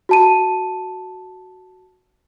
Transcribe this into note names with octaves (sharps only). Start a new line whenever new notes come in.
F#4 A5 D#7